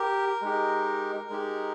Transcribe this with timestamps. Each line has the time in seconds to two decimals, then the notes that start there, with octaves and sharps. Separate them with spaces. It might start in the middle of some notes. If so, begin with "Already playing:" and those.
Already playing: G4 A#4
0.42 G#3 D#4 G4
1.30 G#3 D#4 G4